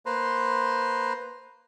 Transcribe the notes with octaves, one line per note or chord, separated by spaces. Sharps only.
A#3 B4 C5 A#5 C6